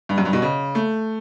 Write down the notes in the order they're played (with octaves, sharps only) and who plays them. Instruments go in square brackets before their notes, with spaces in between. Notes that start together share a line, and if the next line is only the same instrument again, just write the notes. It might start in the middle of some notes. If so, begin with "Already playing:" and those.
[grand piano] G2
F#2
G2
B2
C#3
A3